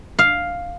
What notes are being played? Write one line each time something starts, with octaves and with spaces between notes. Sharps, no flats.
F5